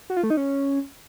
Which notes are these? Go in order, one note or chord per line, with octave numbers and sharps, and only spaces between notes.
F#4
F4
A3
D#4
C#4